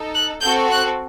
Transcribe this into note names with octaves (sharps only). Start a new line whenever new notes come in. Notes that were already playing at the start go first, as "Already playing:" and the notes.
Already playing: D#4 A4
F#6
C4 F#4 A4 G6
F#6